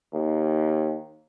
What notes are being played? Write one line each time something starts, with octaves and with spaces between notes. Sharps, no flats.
D#2